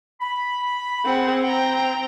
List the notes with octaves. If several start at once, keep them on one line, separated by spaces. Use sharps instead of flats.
B5
C4 G#4 F#5
C4 G5 A#5